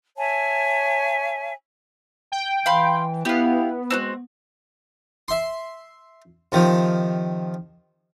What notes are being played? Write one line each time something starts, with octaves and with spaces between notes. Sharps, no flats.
C#5 E5 G#5 A5
G5
E3 F5 B5 C6
B3 E4 G4 F5
G#3 C4 D#4 F#4
E5 C6
C3 D#3 F3